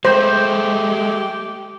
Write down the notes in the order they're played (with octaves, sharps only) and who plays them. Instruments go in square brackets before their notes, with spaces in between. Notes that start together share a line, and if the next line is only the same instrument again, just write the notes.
[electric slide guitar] G#3 A3 [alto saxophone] G4 [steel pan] C5